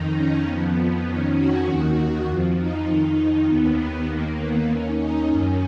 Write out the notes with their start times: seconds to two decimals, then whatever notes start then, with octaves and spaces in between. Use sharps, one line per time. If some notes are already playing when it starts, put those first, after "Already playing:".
Already playing: F2 D#3 D#4
0.15 C#4
0.45 F2 F3 B3
0.75 B3
1.06 F2 D#3 C#4
1.35 F#4
1.67 D#2 D#3
2.27 F2 F3
2.57 D#4
2.87 F2 D#3
3.48 D#2 D#3 B3
3.78 B3
4.08 D#2 D#3 A#3
4.39 B3
4.68 D#2 D#3 C#4
4.99 D#4
5.30 F#2 D#3 C#4